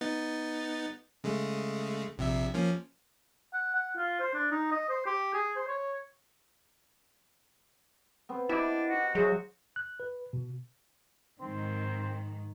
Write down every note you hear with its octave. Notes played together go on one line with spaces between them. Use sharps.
B3 D#4 A6
C#3 G#3 A3
A#1 C3 E5
F3 A#3 C#4
F#5
F#5
F4
C5
D4
D#4
D#5
C5
G4
G#4
C5
C#5
B3 C4
D4 E4 G4 D#5 D6
F#4 F#5
F#3 F#4 G#4 C5 E5 C6
F#6
B4
B2
G#2 D#3 C4